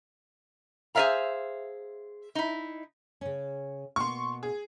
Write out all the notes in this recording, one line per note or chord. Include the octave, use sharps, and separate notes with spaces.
G#4 C5 D5 E5 F5 A#5
D#4 E4
C#3 C#4
B2 A#3 A#4 C6 C#6
G#4